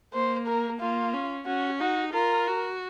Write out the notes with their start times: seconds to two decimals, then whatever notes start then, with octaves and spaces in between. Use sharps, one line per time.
0.13 A#3 C5
0.47 A#4
0.81 A#3 F4
1.13 C#4
1.46 C#4 F#4
1.81 D#4 F#4
2.13 F4 A#4
2.47 F#4